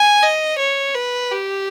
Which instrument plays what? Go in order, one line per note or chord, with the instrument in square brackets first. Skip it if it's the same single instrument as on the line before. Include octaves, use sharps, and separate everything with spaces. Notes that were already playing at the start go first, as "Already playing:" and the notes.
Already playing: [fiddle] G#5
D#5
C#5
B4
G4